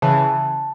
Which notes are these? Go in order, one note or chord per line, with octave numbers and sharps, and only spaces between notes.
C#3 E3 A5